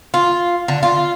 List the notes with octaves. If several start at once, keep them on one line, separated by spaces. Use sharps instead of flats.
F4
D3
F4